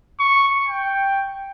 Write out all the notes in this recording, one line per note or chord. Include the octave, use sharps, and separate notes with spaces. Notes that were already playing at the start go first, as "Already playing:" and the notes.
C#6
G5